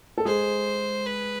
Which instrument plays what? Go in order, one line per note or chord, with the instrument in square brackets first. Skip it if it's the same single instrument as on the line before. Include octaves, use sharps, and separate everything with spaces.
[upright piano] A4
[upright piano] G#3 G#4 [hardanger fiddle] C5
[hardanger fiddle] B4